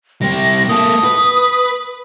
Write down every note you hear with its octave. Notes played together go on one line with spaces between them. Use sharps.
G3 C4 A#6
A#3 A4 D#6
B4